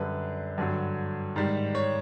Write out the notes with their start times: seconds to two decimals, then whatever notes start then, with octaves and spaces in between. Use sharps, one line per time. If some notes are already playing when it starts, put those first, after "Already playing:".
Already playing: F#2 D3 G3 B4
0.58 G2 D3 F#3
1.36 G#2 D#3 G3
1.75 C#5